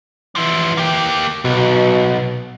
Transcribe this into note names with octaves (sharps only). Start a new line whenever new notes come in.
E3 F3 E4
A#3 G4
B1 B2